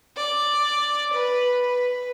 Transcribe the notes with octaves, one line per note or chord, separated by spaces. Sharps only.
D5
B4
B4